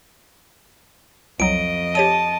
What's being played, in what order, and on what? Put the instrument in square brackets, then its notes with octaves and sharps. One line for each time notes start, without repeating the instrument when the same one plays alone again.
[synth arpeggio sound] C2 F#3 [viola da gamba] F2 D#5 [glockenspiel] D7
[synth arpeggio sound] G4 C#5 D#6 [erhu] A5 [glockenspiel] D#7